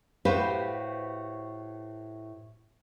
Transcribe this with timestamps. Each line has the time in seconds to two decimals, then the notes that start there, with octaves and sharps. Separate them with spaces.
0.25 A2 F#4 G4 B4 C5 F5